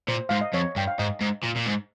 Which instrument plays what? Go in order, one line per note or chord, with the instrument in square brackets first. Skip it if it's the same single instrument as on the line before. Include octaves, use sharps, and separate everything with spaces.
[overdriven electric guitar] A#2 [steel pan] C5
[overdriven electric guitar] G#2 [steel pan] F5
[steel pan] D#5
[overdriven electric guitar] F2 [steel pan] C#5
[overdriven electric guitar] G2 [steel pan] G5
[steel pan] F5
[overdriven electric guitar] G#2 [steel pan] D#5
[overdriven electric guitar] G#2
A#2
A#2
G#2